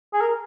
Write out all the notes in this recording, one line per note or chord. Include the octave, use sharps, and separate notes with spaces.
G#4
A#4